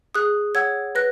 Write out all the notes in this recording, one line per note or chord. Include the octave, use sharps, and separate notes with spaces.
G#4 D#6 F#6
C#5 F#5 E6 G#6
B4 F#6 A#6